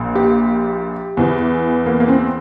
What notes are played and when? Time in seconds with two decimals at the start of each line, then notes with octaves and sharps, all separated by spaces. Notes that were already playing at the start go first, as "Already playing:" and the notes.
Already playing: A#1 A#2
0.15 G4
1.17 E2 E3
1.86 A#3
2.00 A#3
2.08 C4